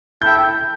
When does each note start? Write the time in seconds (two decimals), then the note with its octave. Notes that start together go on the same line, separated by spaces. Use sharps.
0.22 E4 A4 E5 G5 G6